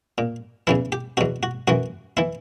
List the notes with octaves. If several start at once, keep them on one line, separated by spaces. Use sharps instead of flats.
A#2
E2 C#3 E3 E4
G4
E2 B2 F#4
F#4
F#2 E3 F#4
E3 E4